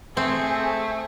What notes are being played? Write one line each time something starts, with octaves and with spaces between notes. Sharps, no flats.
A3 C4 G#4